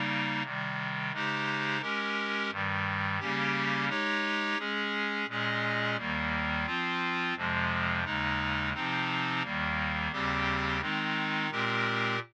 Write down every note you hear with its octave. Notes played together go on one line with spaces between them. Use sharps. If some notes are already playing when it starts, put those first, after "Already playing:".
Already playing: C#3 G3 A#3 D#4
C3 D#3 G3
C#3 G#3 D#4 G4 C5
G#3 C#4 G4 A#4
G2 D#3 G3
C#3 G3 A#3 C#4 G4
G#3 D#4 G4 C#5
G#3 C#4 G#4
A#2 G#3 C#4 G#4 D#5
D#2 D#3 G3 A#3
F3 C4 F4
F2 C3 F3 G#3
D#2 C#3 G#3 D#4
C3 F3 C4 D#4
D#2 D#3 G3 A#3
D#2 C#3 G3 C4 G4
D#3 G#3 C4 D#4
A#2 G#3 C4 G4 A#4